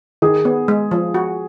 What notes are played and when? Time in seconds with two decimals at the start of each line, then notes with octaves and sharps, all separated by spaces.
0.22 D#3 G#4
0.45 B3
0.68 G#3
0.91 F3
1.14 F#4